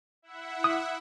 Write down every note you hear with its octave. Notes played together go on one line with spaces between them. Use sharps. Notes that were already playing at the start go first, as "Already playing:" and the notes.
E4 E5 F#5
D#6